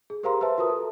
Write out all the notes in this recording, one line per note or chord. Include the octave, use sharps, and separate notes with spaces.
G#4
G4 A#4 C5 F5 A#5 C6
B4 C5 E5 A5
F4 F#4 A#4 B4 D#6
A4